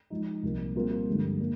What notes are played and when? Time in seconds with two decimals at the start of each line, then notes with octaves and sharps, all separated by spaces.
0.10 F3 G#3 D#4
0.43 C2 A#2 F3 A#3
0.75 A#2 G3 C4 F4 A#4
1.07 G2 D3 F3 G#3
1.39 A#2 G3 A#3